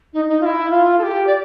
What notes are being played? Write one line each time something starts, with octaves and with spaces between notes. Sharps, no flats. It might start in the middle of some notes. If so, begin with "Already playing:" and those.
D#4
D#4
F4
E4
F4
A4
G4
D5